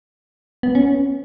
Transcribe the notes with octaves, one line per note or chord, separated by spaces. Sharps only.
B3
C#4